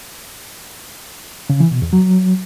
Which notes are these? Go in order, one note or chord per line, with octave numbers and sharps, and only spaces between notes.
C#3
E3
B2
E2
F#3